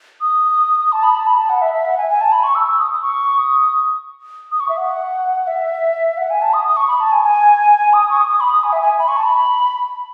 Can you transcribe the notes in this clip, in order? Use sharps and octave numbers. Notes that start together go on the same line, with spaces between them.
D#6
A5
B5
A5
B5
A5
F#5
E5
E5
F#5
G#5
G#5
A5
B5
C#6
E6
E6
D#6
D#6
C#6
D#6
D#6
C#6
E5
F#5
E5
F#5
G#5
A5
D#6
D#6
C#6
B5
A5
G#5
G#5
D#6
C#6
D#6
D#6
B5
D#6
G#5
E5
G#5
B5
C#6
A5
B5